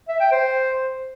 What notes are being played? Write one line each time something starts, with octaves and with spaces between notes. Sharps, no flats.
E5
G5
C5